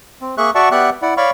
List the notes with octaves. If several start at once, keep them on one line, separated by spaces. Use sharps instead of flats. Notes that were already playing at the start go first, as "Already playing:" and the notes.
C4
A#3 G#4 E5 C#6 F#6
F#4 D5 E5 F#5 A5 C#6
B3 G4 D5 E5 F#5 F#6
E4 D5 F#5
C#5 D5 F5 B5 C#6